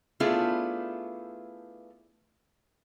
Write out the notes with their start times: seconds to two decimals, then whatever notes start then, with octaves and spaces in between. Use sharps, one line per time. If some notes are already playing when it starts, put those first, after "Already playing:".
0.20 A3 B3 D4 E4 F4 G#4